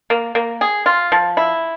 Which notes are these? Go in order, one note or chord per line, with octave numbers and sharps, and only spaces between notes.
A#3
A#3
G#4
F4
F3
E4